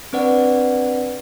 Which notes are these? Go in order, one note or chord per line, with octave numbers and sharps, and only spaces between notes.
C4 D4 B4 D5 F#5